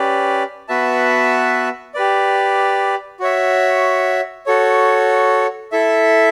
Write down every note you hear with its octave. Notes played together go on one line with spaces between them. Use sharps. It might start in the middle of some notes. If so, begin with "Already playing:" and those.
Already playing: C#4 G4 B4 D5
B3 F#4 B4 E5 A5
G4 B4 D5
F#4 C#5 E5
F#4 A4 C#5
E4 A4 E5